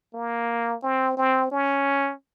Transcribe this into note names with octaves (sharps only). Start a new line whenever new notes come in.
A#3
C4
C4
C#4